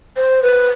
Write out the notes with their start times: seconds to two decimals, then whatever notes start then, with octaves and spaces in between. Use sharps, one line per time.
0.17 C5
0.43 B4